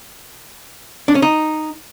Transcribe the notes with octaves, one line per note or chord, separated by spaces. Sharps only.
D4
C#4
D#4